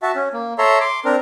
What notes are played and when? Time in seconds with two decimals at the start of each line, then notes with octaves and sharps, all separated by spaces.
0.02 F#4 E5 A5
0.15 C#4
0.33 A#3
0.58 A4 C#5 E5 A#5 C6
0.81 C6 D6
1.05 C4 D4 A#4